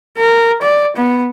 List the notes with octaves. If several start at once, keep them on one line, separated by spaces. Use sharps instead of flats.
A#4
D5
B3